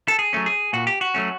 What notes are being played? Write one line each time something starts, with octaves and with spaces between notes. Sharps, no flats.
A4
G#4
F#3 A3 C#4
G#4
A#2 F#4
G4
F#4
F#3 A3 C#4